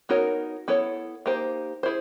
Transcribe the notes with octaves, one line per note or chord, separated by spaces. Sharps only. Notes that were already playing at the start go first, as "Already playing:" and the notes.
B3 D#4 F#4 A#4 C#5
B3 E4 A4 C#5
A#3 D#4 G4 C5
E4 G#4 C5